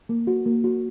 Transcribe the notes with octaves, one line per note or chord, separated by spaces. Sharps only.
A#3
F#4
A#3
F#4